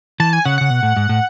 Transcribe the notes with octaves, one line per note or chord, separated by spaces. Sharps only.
E3 A5
G#5
C#3 F#5
C#3 F#5
B2
A2
G#2
A2